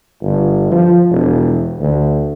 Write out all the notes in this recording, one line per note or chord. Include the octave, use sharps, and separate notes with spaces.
G1
F3
E1
D2